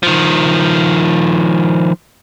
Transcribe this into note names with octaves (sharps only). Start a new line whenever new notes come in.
D#3 F3